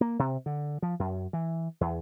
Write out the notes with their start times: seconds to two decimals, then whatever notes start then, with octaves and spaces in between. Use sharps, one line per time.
0.01 A#3
0.19 C3
0.46 D3
0.82 F3
0.99 F#2
1.33 E3
1.81 E2